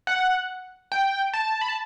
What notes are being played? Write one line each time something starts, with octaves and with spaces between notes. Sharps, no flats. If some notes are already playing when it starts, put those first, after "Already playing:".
F#5
G5
A5
B5
A5